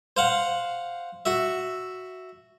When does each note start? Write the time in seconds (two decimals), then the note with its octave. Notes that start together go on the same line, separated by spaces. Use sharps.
0.17 C5 F5 F#5
1.26 F#4 E5